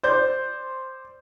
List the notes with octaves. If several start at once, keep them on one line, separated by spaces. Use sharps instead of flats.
C5 D5 G6